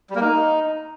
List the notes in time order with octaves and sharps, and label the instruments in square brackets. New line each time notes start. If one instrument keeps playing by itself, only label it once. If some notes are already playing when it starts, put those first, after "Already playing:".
[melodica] G3
A#3
D#4